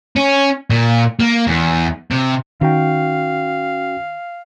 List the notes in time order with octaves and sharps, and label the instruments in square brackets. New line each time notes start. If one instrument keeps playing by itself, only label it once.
[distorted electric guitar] C#4
A#2
A#3
E2
C3
[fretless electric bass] D#3 [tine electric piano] C#4 F#4 G5 [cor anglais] F5